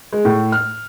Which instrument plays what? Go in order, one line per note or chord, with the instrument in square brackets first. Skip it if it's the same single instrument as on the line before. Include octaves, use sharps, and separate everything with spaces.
[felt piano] G#3
A2
F6